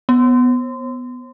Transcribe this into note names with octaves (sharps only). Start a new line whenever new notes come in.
B3